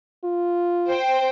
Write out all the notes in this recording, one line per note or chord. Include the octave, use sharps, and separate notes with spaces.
F4
C5 G5